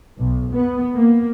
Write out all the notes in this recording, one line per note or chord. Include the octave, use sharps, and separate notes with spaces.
B1
B3
A#3